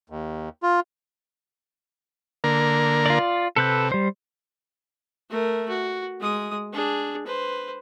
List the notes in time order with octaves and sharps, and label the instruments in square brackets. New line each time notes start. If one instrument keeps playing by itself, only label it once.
[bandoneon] D#2
F4
[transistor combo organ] D3 A#3 A#4
[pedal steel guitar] F4 D5
[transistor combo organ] C3 [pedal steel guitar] A4 B4 G6
[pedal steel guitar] G3 C5
[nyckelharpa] A3 A#4
F#4
G#3 D#6
D4 G#4
B4 C5